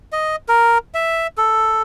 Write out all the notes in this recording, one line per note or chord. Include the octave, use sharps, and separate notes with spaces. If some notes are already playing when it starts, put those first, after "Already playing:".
D#5
A#4
E5
A4